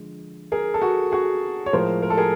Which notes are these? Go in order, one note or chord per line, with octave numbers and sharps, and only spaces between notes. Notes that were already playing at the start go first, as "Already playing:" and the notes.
Already playing: D3 F3 G#3
G#4 A#4
A4
F#4 G#4
F#4 G#4
C#5
A2 F3 G#3 A#4 C5
A#4
A4
G#4 A#4